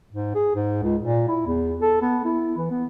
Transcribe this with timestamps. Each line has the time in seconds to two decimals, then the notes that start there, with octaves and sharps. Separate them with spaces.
0.12 G#2
0.35 G#4
0.55 G#2
0.83 C#2
1.02 A#2
1.28 E4
1.46 E2
1.81 A4
2.01 B3
2.25 E4
2.57 E3
2.71 B3